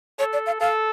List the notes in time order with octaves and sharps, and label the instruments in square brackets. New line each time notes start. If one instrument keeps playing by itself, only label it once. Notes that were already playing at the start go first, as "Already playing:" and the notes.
[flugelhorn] A4 [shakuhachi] C#5
[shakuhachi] D5
F5
[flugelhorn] A4 [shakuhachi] F5